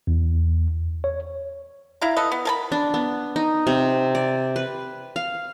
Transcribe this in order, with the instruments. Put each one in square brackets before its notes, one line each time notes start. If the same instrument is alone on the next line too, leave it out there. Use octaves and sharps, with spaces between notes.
[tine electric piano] E2
C#5
[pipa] E4 F5 A#5
A4 B4 D#5
B3
A#4 A5 B5
[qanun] D4
B3
D#4
C3
D5
B4
F5